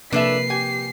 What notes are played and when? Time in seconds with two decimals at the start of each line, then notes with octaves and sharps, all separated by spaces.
0.12 C3 F3 A#3 D4 A4 B4 E5 C7
0.50 G4 G#5